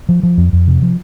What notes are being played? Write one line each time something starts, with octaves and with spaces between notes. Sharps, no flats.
F3
F3
F2
F2
C3
F3